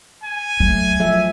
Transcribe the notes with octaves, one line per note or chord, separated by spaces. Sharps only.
G#5
F#3 A3
F3 A4 E5